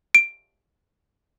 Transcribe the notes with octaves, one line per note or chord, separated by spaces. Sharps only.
D7